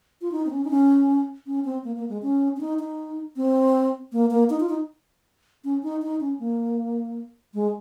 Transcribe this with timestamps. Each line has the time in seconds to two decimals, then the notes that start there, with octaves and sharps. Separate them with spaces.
0.22 F4
0.32 D#4
0.46 C4
0.51 C#4
0.65 D#4
0.70 C#4
1.47 C#4
1.65 C4
1.84 A#3
1.96 A#3
2.09 G#3
2.22 C#4
2.56 C#4
2.61 D#4
2.79 D#4
3.36 C4
4.13 A#3
4.31 A#3
4.50 D#4
4.60 F4
4.69 D#4
5.65 C#4
5.83 D#4
6.02 D#4
6.21 C#4
6.40 A#3
7.54 G#3